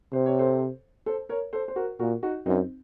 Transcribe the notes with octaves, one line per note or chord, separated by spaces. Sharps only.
C3 C5
C#5
A4 C5
A4 C5
A#4 C#5
A4 C5
C5
F#4 A#4
A#2 F#4 A#4
D#4 F#4
F#2 C4 D#4